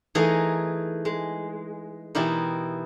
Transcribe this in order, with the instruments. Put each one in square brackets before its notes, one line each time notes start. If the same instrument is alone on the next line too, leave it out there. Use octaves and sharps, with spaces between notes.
[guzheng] E3 A3 D#4 G#4 A#4 D#5
G#3
B2 E3 D#4 E4 G4 A#4